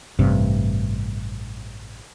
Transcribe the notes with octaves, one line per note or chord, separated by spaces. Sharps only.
A1 G2 C3